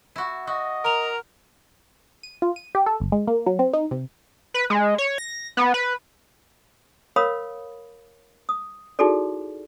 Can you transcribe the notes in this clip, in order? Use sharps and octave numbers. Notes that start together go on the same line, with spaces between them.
E4 F#4
F#4 D#5
A#4 A#5 F7
D#7
F4
D#7
G4
A4
G1
G#3
A#3
F#3
C4
D#4
C3
B4
G#3
C#5
A#6
B3
B4
A#4 C#5 F5 B5 D#6
D#6
D#4 E4 F#4 G#4 A4 D5